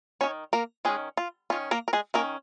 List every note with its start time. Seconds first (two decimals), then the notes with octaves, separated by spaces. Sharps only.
0.21 C#4 C#5
0.23 D#3
0.53 A#3 A#4
0.85 D#3 G#3 C#4 G#4
1.17 F4
1.50 D#3 C#4 F4
1.71 A#3 A#4
1.88 A#4
1.93 G#3 G#4
2.14 D#3 A#3 C#4 A#4